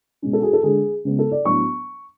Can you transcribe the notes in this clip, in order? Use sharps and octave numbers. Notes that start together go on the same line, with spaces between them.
B2 G#3 C#4
A4
F#4
G#4
A4
D3 G#3 D4 G#4
C#3 G#3 B3
A4
D5
A2 F#3 B3 D4 C#6